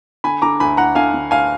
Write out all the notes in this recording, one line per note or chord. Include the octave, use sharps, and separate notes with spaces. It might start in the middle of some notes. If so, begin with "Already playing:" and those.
D3 G#5 B5
D3 A#5 D6
D2 G#5 B5
D2 F#5 A#5
D3 F5 G#5
D3
D2 F5 G#5